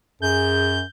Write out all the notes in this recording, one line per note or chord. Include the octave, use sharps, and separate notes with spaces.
F#2 G#4 G6